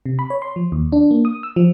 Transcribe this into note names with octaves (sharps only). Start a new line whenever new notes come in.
C3
B5
C#5
C6
F3
D#2
D4
A#3
D#6
E6
F3